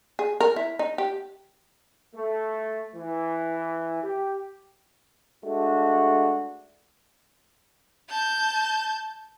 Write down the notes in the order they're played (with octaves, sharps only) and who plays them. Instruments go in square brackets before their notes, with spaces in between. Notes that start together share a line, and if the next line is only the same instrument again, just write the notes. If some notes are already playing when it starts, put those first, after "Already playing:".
[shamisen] G#4
A#4
E4
D#4
G4
[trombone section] A3
E3
G4
G#3 A3 D4 F#4
[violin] A5 G6